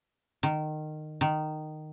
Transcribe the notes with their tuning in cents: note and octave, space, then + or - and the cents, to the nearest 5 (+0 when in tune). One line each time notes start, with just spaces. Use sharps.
D#3 -20
D#3 -15